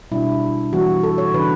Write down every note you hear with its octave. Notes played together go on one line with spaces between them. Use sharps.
B2 G3 D4 E4
E3 G3 B3 F#4
A4
C#5
C#3 E3 B3 D4 B4